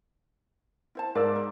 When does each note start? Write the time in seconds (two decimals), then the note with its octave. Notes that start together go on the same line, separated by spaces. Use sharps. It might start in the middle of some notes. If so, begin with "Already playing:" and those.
0.95 E4 C5 A5
1.15 G#2 A#4 D5 F5 E6
1.36 D#4